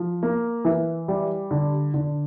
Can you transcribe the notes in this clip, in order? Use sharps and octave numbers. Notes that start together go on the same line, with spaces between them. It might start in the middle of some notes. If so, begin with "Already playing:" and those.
Already playing: F3
A#3
E3
G3
D3
D3